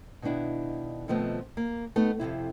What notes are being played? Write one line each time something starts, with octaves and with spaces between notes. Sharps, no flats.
B2 D#3 B3 D4 E4
B2 D#3 F3 A3 B3 C4
A#3
A3 B3 D#4
F2 G#2 C3 E4